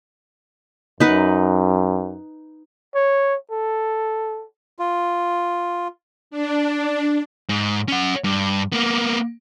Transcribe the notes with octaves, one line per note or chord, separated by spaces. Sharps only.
F#2 D#4 B4 F#5
C#5
A4
F4
D4
G#2
C#4 F#5
G2
A#3 B3